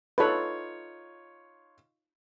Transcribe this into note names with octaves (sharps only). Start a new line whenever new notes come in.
D#4 F4 A4 B4 C#5